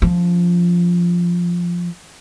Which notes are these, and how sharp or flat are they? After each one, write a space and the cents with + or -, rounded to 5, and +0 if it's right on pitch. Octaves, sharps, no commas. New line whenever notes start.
F3 +0 C#4 +35